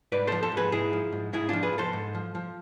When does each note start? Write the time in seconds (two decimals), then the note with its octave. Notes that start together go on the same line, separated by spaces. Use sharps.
0.12 G#2 B4 D5
0.27 F3 A4 C5
0.43 A4 C5
0.52 G#2
0.57 G#4 B4
0.72 G#2 E4 G#4
0.93 F3
1.12 G#2
1.33 G#2 E4 G#4
1.49 F3 D4 F4
1.63 G#4 B4
1.73 G#2
1.78 A4 C5
1.93 G#2
2.15 F3
2.35 F3